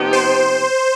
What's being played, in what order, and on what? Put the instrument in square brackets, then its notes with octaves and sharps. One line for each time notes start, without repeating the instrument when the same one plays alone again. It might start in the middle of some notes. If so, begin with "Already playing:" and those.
Already playing: [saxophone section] C3 F3 B3 D#4 G4
[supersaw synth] C5